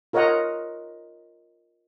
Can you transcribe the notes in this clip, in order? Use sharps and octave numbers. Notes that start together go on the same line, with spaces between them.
F4 A#4 C#5 D#5 F#5 A#5